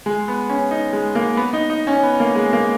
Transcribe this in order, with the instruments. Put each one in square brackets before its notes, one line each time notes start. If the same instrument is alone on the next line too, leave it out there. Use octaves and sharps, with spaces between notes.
[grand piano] G#3
B3
C#4
D#4
G#3
A#3
B3
D#4
D#4
C#4
B3
A#3
G#3
A#3